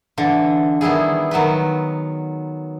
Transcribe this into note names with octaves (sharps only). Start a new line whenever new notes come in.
D3 E3
D#3 G3 B3 E4 G#4
D#3 F#3 B3 B4